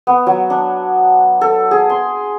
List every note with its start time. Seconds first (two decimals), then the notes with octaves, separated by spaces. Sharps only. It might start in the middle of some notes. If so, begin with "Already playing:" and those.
0.07 B3
0.27 F#3
0.50 D4
1.41 A4
1.71 G#4
1.90 C6